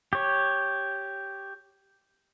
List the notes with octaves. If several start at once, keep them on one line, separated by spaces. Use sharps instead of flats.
G4 C#5